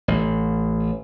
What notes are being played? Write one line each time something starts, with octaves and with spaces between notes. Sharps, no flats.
A1